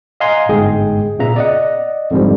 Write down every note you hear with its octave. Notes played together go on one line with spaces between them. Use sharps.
D#5 F5 F#5 G#5 A#5 C6
G1 G#2 G#3 G#4 G5
A#2 C#3 B3 E5 A#5
D5 D#5 F#5
F2 G#2 D3 F3 G3